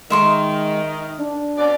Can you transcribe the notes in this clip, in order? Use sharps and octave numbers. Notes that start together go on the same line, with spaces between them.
D#3 G#3 E5 C6 C#6
D4
B2 C#4 D5